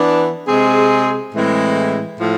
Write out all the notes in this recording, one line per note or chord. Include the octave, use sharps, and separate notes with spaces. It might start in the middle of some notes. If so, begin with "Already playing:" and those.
Already playing: E3 B3 D4
C3 G#3 C4 G#4
A2 E3 G#3 C4 E4
A2 F3